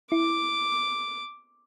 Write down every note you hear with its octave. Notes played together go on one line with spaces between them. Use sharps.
E4 D6